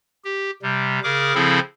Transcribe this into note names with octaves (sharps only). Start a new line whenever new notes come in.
G4
C3 G3
C#3 G#4 A#4 D6
C#3 F3 C4 E4 G#4 A4